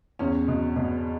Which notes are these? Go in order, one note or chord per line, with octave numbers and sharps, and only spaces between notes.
E2 C#4
B2
B2